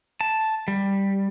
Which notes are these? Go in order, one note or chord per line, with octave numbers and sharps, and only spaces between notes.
A5
G3